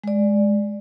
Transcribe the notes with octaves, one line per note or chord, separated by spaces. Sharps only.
G#3 D5